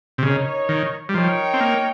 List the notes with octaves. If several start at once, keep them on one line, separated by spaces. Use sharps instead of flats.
C3
C#3 D#4 A#4 C#5
D#3
G3
F3 D#4 A#4 C#5 G5
C4
A#3